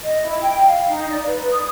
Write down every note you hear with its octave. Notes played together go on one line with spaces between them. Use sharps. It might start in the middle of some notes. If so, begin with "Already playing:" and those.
D#5
E4
G5
F5
D#4
D5
B4
D#6